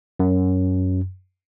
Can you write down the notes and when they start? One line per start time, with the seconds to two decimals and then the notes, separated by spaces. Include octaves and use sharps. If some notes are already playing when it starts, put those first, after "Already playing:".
0.20 F#2